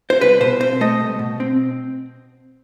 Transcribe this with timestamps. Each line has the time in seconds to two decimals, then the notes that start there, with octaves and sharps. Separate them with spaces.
0.10 C5
0.21 C2 B4
0.41 B2 C5
0.60 C4 C5
0.81 A3 D#5
1.00 C2
1.19 B2
1.40 C4